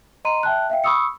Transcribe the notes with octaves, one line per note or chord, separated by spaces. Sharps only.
D#5 A#5 C6 D#7
E5 G5 A5 F#6
E5 F5 G5
B5 C#6 D#6 E6 C#7